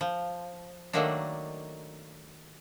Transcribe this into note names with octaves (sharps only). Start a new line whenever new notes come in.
F3
D#3 F#3 A3 A#3 D4